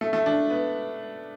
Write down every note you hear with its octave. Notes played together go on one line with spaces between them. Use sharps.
A3
A3
D4
B3